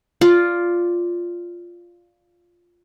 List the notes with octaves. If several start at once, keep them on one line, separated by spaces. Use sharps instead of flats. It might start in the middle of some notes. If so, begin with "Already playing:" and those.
F4 D5